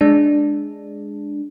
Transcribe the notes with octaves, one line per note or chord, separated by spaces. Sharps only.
G#3 D4